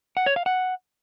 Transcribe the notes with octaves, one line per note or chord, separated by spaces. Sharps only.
F#5
C#5
F5
F#5